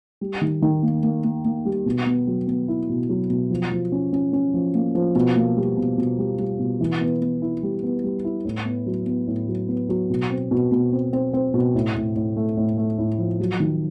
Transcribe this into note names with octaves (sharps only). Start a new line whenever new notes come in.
G3
D#3
D#3
A#3
A#3
A#3
A#3
G3
B2
B3
F#3
B3
E4
B2
F#3
B2
F3
F3
C#4
C#4
C#4
F3
A#3
F3
B2
A#3
G3
B2
B2
G3
G3
B2
E3
B3
B3
E4
G3
B3
G3
E4
A2
B3
F#3
B3
A2
F#3
B3
F#3
B2
C4
B2
B2
C4
C4
C4
B2
A2
A2
A2
A3
A2
A3
A2
F3
F#3
D#3